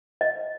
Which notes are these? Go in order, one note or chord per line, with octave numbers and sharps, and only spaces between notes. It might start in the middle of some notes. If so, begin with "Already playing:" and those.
D#5